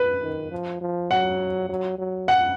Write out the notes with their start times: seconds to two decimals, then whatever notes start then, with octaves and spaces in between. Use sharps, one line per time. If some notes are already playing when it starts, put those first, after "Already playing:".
Already playing: B4
0.23 D#3
0.52 F3
0.81 F3
1.11 F#3 F#5
1.69 F#3
1.99 F#3
2.28 F#5